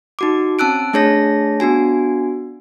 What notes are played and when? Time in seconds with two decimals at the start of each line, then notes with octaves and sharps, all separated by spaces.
0.19 D#4 F#4 D6
0.59 C4 C#4 A5 E6 F#6 D7
0.93 A3 D4 G#4 C#5 A5 A#6
1.60 B3 D4 F#4 G#5